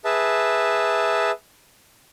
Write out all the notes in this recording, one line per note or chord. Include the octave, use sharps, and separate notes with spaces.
G#4 B4 E5 A5